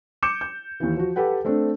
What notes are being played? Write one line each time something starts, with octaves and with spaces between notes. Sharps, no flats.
D6 G6 C#7 E7
G6
D#2 E3
F3 F#4
G4 A4 B4 F#5
A3 C4 D4 A4